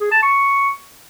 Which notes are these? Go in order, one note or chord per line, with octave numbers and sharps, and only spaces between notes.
G#4
A5
C#6